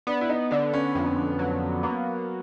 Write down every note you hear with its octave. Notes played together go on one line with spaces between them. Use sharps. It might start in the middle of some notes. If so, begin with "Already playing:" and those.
B3 D4
E4
D#4
D3 D4
C#4
F2
F#3
A#3 B3